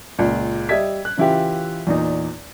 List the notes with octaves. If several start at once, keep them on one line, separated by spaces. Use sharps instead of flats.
C#2 A#2
G3 D#5 E5 G#6 B6
F#6
C#3 E3 E4 F4 G4
E2 A#2 D#4